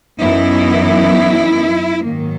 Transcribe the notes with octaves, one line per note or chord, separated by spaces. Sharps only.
F#2 E3 B3 D#4 E4
G#2 D#3 F#3 A#3